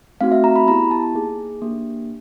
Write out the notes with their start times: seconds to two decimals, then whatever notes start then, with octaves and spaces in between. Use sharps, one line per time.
0.21 A3 C4 D#4 F#4 F5
0.32 E5
0.44 A#5
0.56 B5
0.67 B3 E4 G4 A#5
0.91 A5
1.15 A#3 D#4 G#4
1.62 A#3 D4 G4